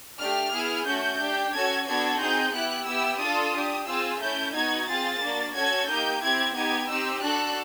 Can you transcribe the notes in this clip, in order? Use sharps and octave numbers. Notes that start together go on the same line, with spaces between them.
A3 D4 G4 F6
B3 E4 G#4
A3 C#4 F#4 G6
D4 G4
C#4 F#4 A4 G#6
B3 D4 F#4 A4 G#6
C4 D#4 G#4 G6
B3 E4 G4 F#6
B3 E4 G4 E6
D4 F4 A4 D#6
D4 G4
C4 F4 G#4 E6
A3 C#4 E4 G6
B3 D#4 F#4 G#6
C4 F4 G#4 A6
A#3 D4 F#4
C#4 F#4 A4 G#6
A#3 D#4 G4 G6
C4 E4 G4 G#6
B3 D#4 G4 G#6
C4 D#4 G4 E6
D4 F#4 A4 F#6